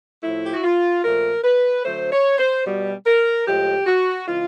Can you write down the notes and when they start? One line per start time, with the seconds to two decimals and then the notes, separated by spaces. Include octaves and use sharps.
0.23 A2 F3 A3 E4
0.45 G4
0.54 F#4
0.64 F4
1.04 A#2 F3 A3 A#4
1.44 B4
1.84 D3 F#3 A3 C5
2.12 C#5
2.39 C5
2.65 B2 G3
3.06 A#4
3.47 A2 F3 G#3 G4
3.86 F#4
4.28 C#3 E3 G#3 F4